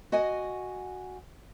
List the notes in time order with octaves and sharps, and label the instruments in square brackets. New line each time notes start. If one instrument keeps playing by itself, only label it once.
[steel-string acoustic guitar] F#4 D#5 F#5 G#5